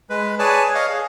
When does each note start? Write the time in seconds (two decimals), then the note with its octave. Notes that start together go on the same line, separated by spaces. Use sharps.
0.10 G#3 B4
0.39 G#4 B4 C#5 D5 G#5 A5
0.75 C#5 D#5 F5
0.89 G#4